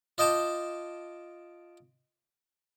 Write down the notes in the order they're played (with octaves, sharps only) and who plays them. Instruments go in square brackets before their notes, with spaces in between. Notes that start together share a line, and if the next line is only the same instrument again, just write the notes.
[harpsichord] F4 D#5 G5 A5 D6